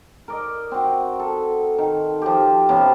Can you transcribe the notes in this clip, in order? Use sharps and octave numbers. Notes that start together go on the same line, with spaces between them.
A#4 D5 D#5
C4 F#4
A4
D#3
F3 G4
C3 F3 B3 C#4